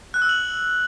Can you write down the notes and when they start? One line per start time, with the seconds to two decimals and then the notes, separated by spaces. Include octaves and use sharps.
0.14 F#6
0.22 E6
0.29 F#7